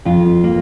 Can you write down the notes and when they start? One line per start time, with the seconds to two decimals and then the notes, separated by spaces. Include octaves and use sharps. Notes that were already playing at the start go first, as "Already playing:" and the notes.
0.05 F2 F4
0.44 A#3